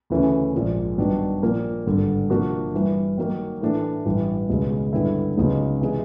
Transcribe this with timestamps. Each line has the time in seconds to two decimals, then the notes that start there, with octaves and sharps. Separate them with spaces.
0.10 D2 C#3 E3 A3 C#4
0.54 A#1 G#2 F3 A#3
0.98 G2 D#3 F#3 B3 D4
1.42 A#2 F3 A#3
1.86 G#1 G2 D3
2.30 C3 F3 A#3 D4 F#4
2.74 G2 E3 G3
3.17 D#3 F#3 A#3
3.61 A2 E3 A3 D4
4.05 A1 G2 E3
4.50 C#2 B2 G#3
4.93 G2 D3 G3 B3 E4
5.37 C#2 C#3 F#3 B3 D#4
5.81 C3 E3 G#3